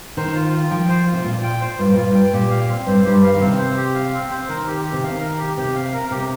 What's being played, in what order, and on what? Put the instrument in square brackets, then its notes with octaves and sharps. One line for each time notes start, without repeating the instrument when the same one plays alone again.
[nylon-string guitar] D#3 [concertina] C5
[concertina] F4
F4
[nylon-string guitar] F3 [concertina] G5
[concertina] C5
F4
[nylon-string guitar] C3
[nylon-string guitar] A#2 [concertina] F4
[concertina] G5
C5
[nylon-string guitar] G2 [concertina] F4
[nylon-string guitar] A#2 [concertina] F4
[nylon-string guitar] G2
[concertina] G5
[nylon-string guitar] A#2 [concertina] G4
[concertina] F5
C4
[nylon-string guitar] G2 [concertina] C5
[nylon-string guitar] G2 [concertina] G4
[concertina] F5
[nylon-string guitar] D#3
[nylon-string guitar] C3 [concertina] C4
[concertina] C5
G4
F5
C4
C5
[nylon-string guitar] D#3 [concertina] A#4
[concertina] G4
G4
[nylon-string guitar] C3
[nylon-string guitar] D#3 [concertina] F5
[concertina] A#4
G4
[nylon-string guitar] C3 [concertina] G4
[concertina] F5
A#4
[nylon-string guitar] C3 [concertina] G4